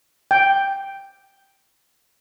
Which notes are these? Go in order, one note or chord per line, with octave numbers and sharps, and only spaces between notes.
G5